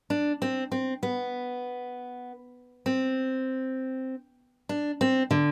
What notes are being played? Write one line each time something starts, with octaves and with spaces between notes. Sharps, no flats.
D4
C4
C4
B3
C4
D4
C4
D3